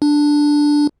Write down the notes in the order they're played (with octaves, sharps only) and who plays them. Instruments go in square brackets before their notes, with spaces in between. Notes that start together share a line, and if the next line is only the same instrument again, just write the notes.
[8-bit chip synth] D4